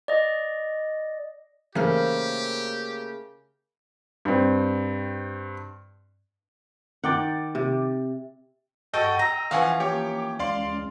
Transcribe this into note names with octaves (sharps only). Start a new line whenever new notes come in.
D5 D#5
C#3 E3 A3 A#3 G4 A#4 C5 F6
G2 C4
D#3 F#5 G5 D6 A6
C3
G2 F#4 A4 D#5 G5
G5 A#5 E6
E3 F3 C#4 F5 F#5 G#5
A#3 G4 C#5 G5 D6
D2 G#3 C#4 D5 F5 C6